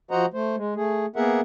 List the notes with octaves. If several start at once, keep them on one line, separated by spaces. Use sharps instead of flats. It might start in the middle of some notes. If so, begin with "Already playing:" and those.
F3 F#4 C5 D#5 F#5 A#5
A3 C5
G#3
A3 G#4
A#3 B3 G#4 A#4 E5 F#5